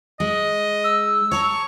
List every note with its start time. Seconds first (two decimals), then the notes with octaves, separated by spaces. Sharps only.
0.20 G#3 D#5
0.84 E6
1.31 C#5 A5 A#5 C#6